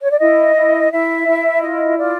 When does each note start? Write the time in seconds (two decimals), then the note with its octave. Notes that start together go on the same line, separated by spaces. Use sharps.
0.03 C#5
0.11 D5
0.19 E4 D#5
0.55 E4
0.91 E4 E5
1.27 E4
1.62 F4 D#5
1.98 F4 D5